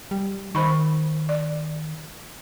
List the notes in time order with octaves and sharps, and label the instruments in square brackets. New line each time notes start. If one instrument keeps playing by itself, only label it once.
[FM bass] G3
[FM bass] D#3 [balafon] C5 B5 C#6
[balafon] D5